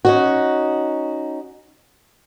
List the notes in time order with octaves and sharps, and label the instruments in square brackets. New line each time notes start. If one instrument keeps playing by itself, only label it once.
[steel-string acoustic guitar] C#4 D#4 F#4